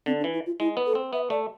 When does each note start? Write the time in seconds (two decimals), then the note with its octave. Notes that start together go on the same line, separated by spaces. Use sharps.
0.06 D3 C4
0.20 D4
0.24 E3
0.33 E4
0.46 F4
0.60 G#3 E4
0.77 B3
0.86 A4
0.95 C4
1.13 B3 E5
1.30 A3 D5